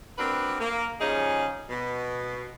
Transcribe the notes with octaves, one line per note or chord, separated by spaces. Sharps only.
A#3 C4 D4 F#4 A#4 B4
A#3
C#3 F3 G3 C#4 D#4 G#4
B2